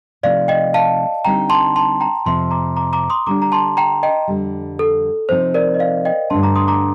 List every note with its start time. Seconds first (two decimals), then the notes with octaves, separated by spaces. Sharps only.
0.23 C3 F3 A3 D#4 D5 F5
0.48 D#5 G5
0.74 F5 A5
1.25 D3 G3 C4 D#4 G5 A#5
1.49 A5 C6
1.76 A5 C6
2.00 G5 A#5
2.25 F2 C3 F3 A5 C6
2.51 A#5 D6
2.76 A#5 D6
2.93 A#5 D6
3.10 C6 D#6
3.27 D3 G3 D4 A#5 D6
3.42 A#5
3.52 A5 C6
3.77 G5 A#5
4.03 D#5 G5
4.28 F2 D3 G3
4.79 A4
5.29 C3 F3 C4 D#4 C5
5.54 A#4 D5
5.74 D#5
5.79 D5 F5
6.05 D#5 G5
6.30 G2 D3 A3 D4 A5 C6
6.43 A#5 D6
6.56 C6 D#6
6.68 A#5 D6